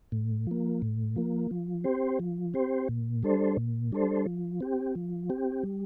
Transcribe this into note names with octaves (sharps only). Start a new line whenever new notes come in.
A2
F3 A#3
A2
F3 A#3
F3
C4 G4 C5
F3
C4 G4 C5
A#2
G3 D4 A4 C5
A#2
G3 D4 A4 C5
F3
C4 G4
F3
C4 G4
G3